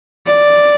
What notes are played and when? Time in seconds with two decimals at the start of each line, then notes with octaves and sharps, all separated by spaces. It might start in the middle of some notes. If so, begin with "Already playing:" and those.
0.26 D5